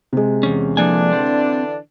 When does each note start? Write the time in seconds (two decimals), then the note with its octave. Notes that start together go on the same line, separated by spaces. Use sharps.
0.13 C3 G#3
0.43 E2 C#4
0.77 D3 E3 F3 A#3 D4 G#5
1.13 C4